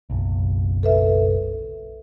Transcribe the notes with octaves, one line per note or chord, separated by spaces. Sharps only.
F#1 B1
A4 B4 E5